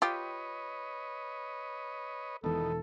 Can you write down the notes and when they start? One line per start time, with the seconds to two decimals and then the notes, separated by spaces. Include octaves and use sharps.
0.02 F4 G4 B4 C#5 D#5
2.44 E1 B2 D#3 E3 A4